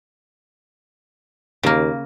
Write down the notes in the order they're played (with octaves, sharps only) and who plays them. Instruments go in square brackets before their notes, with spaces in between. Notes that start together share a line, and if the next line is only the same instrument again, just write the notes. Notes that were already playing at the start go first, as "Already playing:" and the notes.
[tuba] D#2 [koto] C#3 A#3